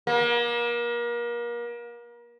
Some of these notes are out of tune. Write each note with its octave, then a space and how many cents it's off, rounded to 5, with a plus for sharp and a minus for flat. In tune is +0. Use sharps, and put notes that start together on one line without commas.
A#3 +35